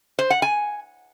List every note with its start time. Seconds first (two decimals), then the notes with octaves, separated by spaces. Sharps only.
0.19 C5
0.30 F#5
0.42 G#5